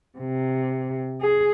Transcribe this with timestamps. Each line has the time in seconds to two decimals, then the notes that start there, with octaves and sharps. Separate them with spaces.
0.18 C3
1.21 G#4